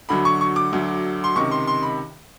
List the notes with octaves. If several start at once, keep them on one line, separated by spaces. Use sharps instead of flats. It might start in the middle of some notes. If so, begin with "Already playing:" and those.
D2 D3 F#3 B5
C#6
C#6
D6
D2 D3 F#3
C6
C#2 C3 D#3 C#6
C6
C6
B5